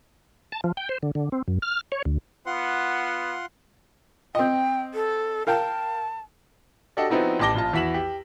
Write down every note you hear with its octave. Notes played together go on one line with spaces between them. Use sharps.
A5
F3
G5
C5
D3
D3
C4
F#2
F6
C#5
D2
B3 F4 F#5 C6
C4 D#5 G5
A4
A#4 F5 G5 A5
D4 F#4 G4 A4 D5 D#5
F3 B3 C4 D#4 E4 F#4
A1 G4 A5 D6 A#6 G7
A#1 F4 A5
E2 E4 F#4 B6 E7 F#7
G4